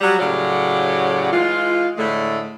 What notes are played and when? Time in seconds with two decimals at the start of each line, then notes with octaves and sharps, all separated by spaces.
0.01 F#3 G3
0.19 A2 C#3 F#3 G4 D5
1.32 E3 G#3 F4
1.97 A2 D3 G#3 A3